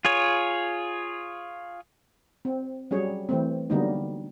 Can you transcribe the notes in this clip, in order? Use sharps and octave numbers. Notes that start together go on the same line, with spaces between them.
F4 G#4 C#5
C4
F#3 G3 C#4 G#4 C#5
E3 A3 C4
D3 F#3 G3 A#3 B3 D#4